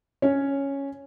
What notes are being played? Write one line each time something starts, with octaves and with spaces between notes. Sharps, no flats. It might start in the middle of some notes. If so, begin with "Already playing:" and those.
C#4 C#5